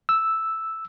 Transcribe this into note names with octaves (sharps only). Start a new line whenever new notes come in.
E6